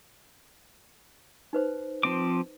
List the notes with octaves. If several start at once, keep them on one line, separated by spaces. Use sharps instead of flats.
D#4 B4 C5
F3 C4 D6